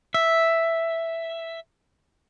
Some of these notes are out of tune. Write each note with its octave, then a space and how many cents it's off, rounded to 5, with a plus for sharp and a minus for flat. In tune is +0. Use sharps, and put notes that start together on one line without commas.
E5 +0